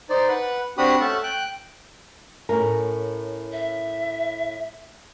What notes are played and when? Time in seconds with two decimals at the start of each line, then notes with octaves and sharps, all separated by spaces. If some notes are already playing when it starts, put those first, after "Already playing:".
0.09 D#4 C5 D5
0.28 B4 F#5
0.78 C4 D4 F#4 G4 B5 D#6
1.00 A3 C#4 E5 F#5 A5
1.23 G5 F#6
2.49 A2 C#4 A#4
3.52 E5